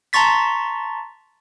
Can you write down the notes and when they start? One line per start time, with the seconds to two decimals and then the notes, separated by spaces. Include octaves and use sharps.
0.13 A5 A#5 C6 C#6 A6 B6